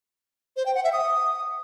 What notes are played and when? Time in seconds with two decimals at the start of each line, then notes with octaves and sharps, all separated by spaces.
0.57 C5
0.66 G5
0.75 F#5
0.84 E5
0.93 D#6